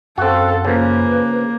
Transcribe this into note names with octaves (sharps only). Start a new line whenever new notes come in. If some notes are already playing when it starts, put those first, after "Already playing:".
F#2 C4 F#4 A4 F5
C#3 F3 A#3 B4